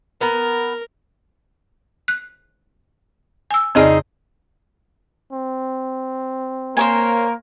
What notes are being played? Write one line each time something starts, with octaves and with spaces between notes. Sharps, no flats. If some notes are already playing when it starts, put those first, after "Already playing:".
B3 A#4 A#5
F#6
G#5 E6
F2 C#3 C4 D#4 G#4 D5
C4
A#3 A#4 C5 C#5 G#5